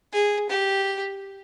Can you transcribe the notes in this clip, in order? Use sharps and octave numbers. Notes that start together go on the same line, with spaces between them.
G#4
G4